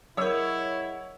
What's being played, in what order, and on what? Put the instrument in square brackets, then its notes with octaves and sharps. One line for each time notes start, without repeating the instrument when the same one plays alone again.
[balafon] F#3 A#4 [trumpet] E4 [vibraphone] G#4 D#5 F#5 [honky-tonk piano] C#5 E6